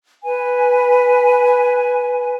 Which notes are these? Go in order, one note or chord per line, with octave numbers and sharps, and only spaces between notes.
B4 G#5